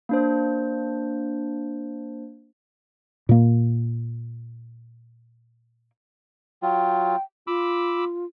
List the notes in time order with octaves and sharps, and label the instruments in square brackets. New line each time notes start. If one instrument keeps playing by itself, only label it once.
[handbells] A#3 D4 C5
[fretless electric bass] A#2 A#3
[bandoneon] F#3 F4 [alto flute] G5
[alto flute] F4 [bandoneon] B5 D6 E6